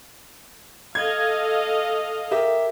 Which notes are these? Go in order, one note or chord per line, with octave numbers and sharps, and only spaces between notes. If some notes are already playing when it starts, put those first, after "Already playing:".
A4 D#5 F5 G#6
G4 A#4 E5